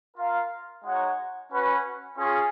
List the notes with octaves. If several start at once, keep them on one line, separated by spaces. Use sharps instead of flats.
F4 A#4 F5
G#3 D#4 F#4 C#5 F#5
C#4 F#4 B4 F#5
C#4 F4 G#4